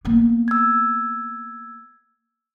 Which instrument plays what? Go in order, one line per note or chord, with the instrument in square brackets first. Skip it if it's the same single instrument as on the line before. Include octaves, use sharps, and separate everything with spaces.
[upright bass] A#3 B3
[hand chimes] E6 G#6